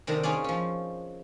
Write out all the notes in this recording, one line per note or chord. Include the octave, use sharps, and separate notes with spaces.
C3 D#3 D4 A4 A#5
C#4 D#4 F4 G#4 D5
F3 C#4